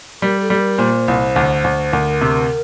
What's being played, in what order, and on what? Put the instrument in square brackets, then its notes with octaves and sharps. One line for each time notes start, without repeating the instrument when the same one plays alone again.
[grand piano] G3 [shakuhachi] A#4
[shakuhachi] A4
[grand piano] G3
[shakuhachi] A#4
[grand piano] A#2 [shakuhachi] C5
[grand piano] C2
D2
D2
[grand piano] D2 [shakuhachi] A#4
[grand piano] C3